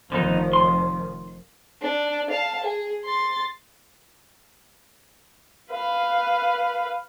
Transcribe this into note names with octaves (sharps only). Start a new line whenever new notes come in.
F1 D3 D#3 F3 B3 D#4
C6
D4
F5 A5
G#4
C6 A6
B4 F5